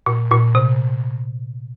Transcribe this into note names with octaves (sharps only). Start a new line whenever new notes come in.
A#2
A#2
C3